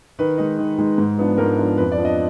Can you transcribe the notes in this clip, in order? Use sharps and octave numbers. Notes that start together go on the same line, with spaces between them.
D#3 B4
G#3 D#4
D#3
G#3 D#4
G#2
F3 B3 D4
G#2 A#4
F3 B3 D4
F2 B4
D5
F3 B3 D4
D#5